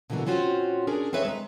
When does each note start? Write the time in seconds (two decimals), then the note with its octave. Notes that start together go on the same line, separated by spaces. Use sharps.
0.10 B2 D3 E3 F#3 A#3 F#4
0.26 A#2 C4 C#4 F4 F#4
0.87 C#4 D4 G#4 A#4
1.13 C4 G#4 B4 C#5 E5 A5
1.25 G#3 A#5